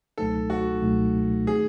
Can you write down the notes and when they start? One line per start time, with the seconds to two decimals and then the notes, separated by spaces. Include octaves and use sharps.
0.18 C#2 B2 F#3 A3 D#4 A4
0.50 F#4
0.82 C#2 B2 F#3 A3 D#4
1.47 D#3 A3 D#4 G#4